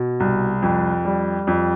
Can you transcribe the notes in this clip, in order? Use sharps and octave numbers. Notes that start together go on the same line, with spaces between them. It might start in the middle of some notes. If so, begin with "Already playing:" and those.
Already playing: B2
C2
F2
G3
F2